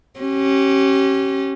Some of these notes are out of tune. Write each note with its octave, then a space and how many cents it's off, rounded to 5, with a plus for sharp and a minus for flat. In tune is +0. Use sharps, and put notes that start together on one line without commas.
C#4 -25 G4 -35